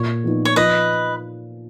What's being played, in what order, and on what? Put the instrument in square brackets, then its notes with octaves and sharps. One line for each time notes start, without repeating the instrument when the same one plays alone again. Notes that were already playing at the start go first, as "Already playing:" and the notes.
Already playing: [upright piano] A#2 [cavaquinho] C#5
[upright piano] F3 B3 D#4
[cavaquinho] C#5
[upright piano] F3 [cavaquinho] B4 D#5